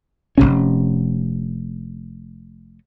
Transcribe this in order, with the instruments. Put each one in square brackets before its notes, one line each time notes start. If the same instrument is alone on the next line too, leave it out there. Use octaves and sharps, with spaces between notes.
[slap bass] F1 A#1 C3 C#4